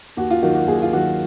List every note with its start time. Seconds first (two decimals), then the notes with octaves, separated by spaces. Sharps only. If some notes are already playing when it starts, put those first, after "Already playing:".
0.17 D#2 F#4
0.30 F4
0.43 D#3 F#3 F#4
0.55 F#4
0.68 D#2 G#4
0.82 F4
0.93 D#3 F#3 F#4